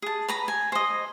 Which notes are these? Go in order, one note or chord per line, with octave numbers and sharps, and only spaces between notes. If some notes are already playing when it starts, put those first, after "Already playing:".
G#4 A5
B4 A#5 B5
G#5
C5 D#5